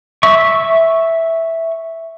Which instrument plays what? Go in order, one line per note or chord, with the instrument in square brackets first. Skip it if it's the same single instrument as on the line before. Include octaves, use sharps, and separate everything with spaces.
[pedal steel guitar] E5 C#6